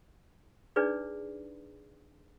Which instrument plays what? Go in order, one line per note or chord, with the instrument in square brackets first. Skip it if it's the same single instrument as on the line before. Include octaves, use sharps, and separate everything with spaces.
[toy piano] D4 D#4 G#4 B4 D5